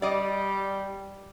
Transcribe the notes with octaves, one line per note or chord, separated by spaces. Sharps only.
G3 D5 D#5